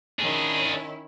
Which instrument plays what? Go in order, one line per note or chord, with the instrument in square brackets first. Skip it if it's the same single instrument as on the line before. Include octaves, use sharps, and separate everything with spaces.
[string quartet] D#3 C#4 E4 [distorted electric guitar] D4 G#4